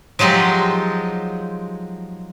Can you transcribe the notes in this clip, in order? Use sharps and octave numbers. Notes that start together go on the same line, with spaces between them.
F3 F#3 G#3 D#4 G4